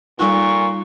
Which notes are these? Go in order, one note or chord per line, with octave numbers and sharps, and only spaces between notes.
A#2 G3 D#4 F4 C#6